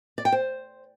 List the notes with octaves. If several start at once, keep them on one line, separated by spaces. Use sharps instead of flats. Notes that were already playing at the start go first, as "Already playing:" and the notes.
D5
G5
C5